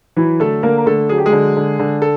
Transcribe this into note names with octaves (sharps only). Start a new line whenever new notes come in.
E3 F#3 E4
D3 A3 A4
D3 A#3 A#4
A#4
D3 A3 A4
F#3 G#4
G4
G#3 G#4
D3
D3
D3
A4